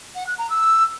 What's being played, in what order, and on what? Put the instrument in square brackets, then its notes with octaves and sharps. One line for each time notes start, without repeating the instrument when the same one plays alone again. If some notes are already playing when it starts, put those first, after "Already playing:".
[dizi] F#5
F#6
A#5
E6